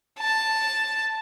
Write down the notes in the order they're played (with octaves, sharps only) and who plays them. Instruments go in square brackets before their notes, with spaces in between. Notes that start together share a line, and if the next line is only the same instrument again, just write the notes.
[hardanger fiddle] A5